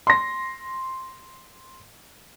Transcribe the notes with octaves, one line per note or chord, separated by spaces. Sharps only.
C6 A#6